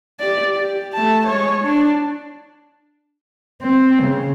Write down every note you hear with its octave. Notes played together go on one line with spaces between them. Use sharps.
G4 D5
G4
A3 A5
G#3 C#5
D4
C4
C#3